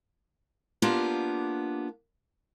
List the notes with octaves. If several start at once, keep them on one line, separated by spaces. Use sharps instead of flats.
A#3 B3 D4 F4 G4